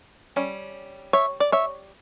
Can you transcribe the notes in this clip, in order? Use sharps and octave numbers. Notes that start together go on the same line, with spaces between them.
G3 C#4
C#5 E5
D5
C#5 E5